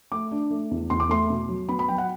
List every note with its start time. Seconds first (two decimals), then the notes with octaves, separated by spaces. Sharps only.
0.12 A3 D6
0.31 D4
0.50 A3
0.71 E2
0.90 E2 C6
1.00 D6
1.09 A3 C6
1.30 B2
1.49 F#3
1.69 B3 B5
1.79 B5
1.88 F#3 G5
1.98 F#5